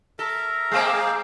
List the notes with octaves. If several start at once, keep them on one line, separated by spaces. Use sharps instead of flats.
A4 A#4 E5 A#5
G#3 A#3 C4 G#4 F5